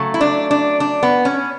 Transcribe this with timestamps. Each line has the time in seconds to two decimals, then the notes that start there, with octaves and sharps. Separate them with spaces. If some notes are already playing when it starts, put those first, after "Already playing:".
Already playing: C#3 F#3 A3
0.14 E4
0.21 D4
0.51 D4
0.80 D4
1.03 B3
1.25 C#4